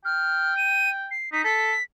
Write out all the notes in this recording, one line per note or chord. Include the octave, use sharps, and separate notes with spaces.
G5 F6
D#7
C7
D#4 B6
A4 B6